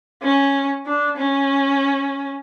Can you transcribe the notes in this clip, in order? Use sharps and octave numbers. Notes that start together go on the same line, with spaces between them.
C#4
D4
C#4